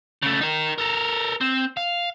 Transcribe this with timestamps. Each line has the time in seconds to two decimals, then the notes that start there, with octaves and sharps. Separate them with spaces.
0.22 C#3 A3
0.41 D#4 A#4
0.78 A4 A#4
1.41 C4
1.77 F5